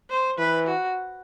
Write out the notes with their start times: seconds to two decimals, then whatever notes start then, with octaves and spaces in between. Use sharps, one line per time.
0.10 C5
0.38 E3 B4
0.67 F#4